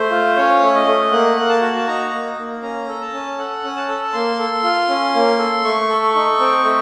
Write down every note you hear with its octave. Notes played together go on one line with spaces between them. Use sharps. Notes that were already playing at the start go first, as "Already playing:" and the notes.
Already playing: A3 C5
F4
C#4 C#5
A3
D#5
A3
A#3 F#5
A#3
A5
F#4
A5
D#4 A#5
A#3
A#3
C#4 A#5
A4
A5
C#4
A4 F#5
C#4
A5
A4
A#3 C6
A4
F4
C#4
A#3
A4
A3 C#6
A4
D#4
C4
A3